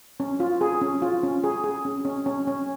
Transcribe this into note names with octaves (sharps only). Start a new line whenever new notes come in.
C#4
F4
G#4
C#4
F4
C#4
G#4
G#4
C#4
C#4
C#4
C#4